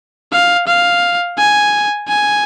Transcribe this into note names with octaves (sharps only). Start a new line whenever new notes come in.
F5
F5
G#5
G#5